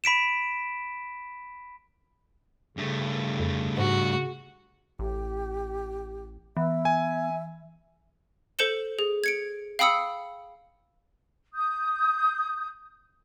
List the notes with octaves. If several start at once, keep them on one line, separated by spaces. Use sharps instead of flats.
B5 B6 D7 E7
G2 C#3 A3
F2
G#2 F#4
A1 G4
E3 B3 E5
G#5
A4 C5 G6 C#7 E7 G7
G#4
G#6 C#7 D7
F5 G5 B5 D#6 E6 C#7
D#6 G6